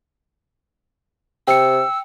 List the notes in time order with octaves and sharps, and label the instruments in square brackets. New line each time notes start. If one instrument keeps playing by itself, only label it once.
[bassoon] C3 [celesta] G5 C#7 [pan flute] E6